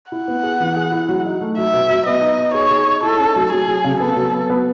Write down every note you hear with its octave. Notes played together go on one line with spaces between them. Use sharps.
E4 F#5
B3
G#4
E3
G#4
E4
F#3
D#4
A3
F#3 E5
B2
F#3
B3 D#5
D#4
D#4
G#4 C#5
G#4
D#4
E4 A4
C#4
F#3
F#3 G#4
F#3
C#3
B3 A4
F#3
B3
B3